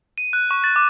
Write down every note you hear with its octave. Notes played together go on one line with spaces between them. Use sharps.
D#7
F#6
C#6
A6
D6